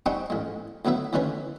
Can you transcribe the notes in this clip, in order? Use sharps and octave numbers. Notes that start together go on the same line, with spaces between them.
G3 C4 D#4 F#5 G#5 C#6
A1 G#3
D2 F#3 B3 E4 E5
D2 D#3 E3 C#4 B4 C#5